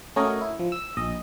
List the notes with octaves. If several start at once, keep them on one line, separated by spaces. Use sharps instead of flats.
A3 C#4 F#4 A#4 C#5 D#5
E4
F3
E6
A#1 D#5